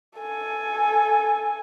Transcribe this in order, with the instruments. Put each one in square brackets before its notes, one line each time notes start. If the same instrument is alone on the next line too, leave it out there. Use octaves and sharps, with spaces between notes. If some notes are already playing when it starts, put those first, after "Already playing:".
[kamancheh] A4 G#5